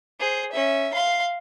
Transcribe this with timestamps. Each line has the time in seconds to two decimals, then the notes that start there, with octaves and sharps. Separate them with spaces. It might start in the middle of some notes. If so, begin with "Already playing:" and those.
0.20 G#4 C5
0.52 C#4 E5
0.94 F5 C6